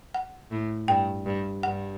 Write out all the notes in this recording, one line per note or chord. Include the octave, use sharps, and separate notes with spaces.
F#5
A2
G2 G5
G2
G2 F#5